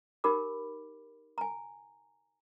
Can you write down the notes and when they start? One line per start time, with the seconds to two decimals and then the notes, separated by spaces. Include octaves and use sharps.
0.24 D#4 G4 A#4 B5 D6
1.38 G#5 A#5